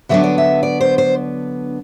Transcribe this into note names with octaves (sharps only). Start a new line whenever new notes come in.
D3 F#3 B3 D4 E5
D5
E5
D5
C5
C5